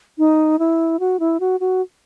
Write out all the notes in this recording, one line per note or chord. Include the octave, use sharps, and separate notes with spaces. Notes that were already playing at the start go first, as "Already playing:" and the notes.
D#4
E4
F#4
E4
F#4
F#4